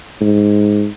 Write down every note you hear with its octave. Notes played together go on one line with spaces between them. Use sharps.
G#2